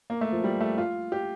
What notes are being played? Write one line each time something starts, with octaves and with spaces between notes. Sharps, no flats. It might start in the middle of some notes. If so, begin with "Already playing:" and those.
A#3
A3
F3
G3
A3
F4
G4